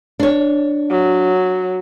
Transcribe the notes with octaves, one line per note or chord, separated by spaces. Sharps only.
D4 C#5
F#3